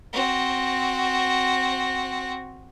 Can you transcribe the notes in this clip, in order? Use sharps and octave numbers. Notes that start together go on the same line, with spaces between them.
C4 F#4